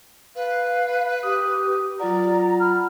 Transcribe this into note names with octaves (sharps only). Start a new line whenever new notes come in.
B4 F5
G4 D#6
F#3 F4 D5 F#5 A#5
B5 F6